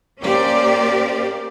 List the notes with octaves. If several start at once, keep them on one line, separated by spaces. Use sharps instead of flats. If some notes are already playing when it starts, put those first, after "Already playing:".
A#3 C#4 G4 A#4 C5 D5